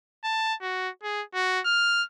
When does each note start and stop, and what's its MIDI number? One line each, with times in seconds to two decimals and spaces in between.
0.24 0.54 81
0.61 0.89 66
1.03 1.22 68
1.34 1.60 66
1.65 2.03 89